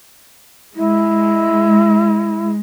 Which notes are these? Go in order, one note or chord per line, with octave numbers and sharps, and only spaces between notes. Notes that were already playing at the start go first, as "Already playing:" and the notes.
G#3 E4